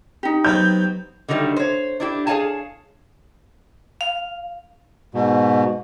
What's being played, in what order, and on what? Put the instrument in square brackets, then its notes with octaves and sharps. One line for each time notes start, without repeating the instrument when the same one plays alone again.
[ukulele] D#4 G4
[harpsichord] F#3 B3 C4 [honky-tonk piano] G6
[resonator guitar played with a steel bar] D3 D#3 F#3 G3 A3
C5 C#5
D4 E4 G4
G#4 C#5 D5 F5 G#5 A5
[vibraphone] F5
[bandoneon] G#2 B2